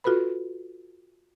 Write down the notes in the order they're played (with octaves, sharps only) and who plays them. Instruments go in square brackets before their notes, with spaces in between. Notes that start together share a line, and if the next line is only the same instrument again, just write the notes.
[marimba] F4 F#4 A4 B4 B5